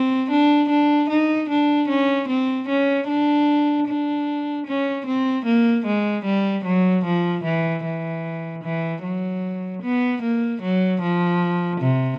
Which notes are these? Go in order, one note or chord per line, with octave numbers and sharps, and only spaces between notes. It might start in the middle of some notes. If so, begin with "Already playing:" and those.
Already playing: C4
D4
D4
D#4
D4
C#4
C4
C#4
D4
D4
C#4
C4
A#3
G#3
G3
F#3
F3
E3
E3
E3
F#3
B3
A#3
F#3
F3
C3